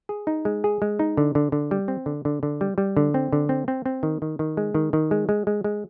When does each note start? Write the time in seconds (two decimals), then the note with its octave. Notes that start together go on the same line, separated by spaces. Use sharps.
0.09 G#4
0.27 D#4
0.45 G#3
0.64 G#4
0.82 G#3
0.99 D#4
1.17 D3
1.35 D3
1.52 D3
1.71 G3
1.88 C4
2.06 D3
2.25 D3
2.43 D3
2.61 G3
2.78 G3
2.97 D3
3.14 C4
3.33 D3
3.49 C4
3.68 C4
3.86 C4
4.03 D#3
4.22 D#3
4.39 D#3
4.57 G#3
4.74 D#3
4.93 D#3
5.11 G#3
5.29 G#3
5.47 G#3
5.64 G#3